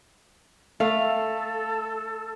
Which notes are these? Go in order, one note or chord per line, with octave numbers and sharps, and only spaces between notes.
A3 A4 F5